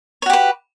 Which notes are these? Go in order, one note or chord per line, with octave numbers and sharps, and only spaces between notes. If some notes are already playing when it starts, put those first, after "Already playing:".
F#4 G4 B4 C#5